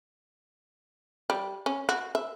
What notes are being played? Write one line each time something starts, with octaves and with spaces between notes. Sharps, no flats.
G3
C#4
F#4
E5